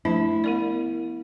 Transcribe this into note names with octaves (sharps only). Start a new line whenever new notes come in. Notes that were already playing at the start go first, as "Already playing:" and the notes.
F3 A3 D4 E4
B3 A#4 D5